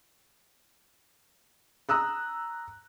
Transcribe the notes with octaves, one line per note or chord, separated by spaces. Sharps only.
A#5 D#6 E6 F#6